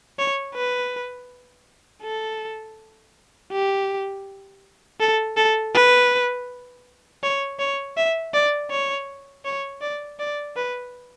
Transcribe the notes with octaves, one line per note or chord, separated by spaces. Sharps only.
C#5
B4
A4
G4
A4
A4
B4
C#5
C#5
E5
D5
C#5
C#5
D5
D5
B4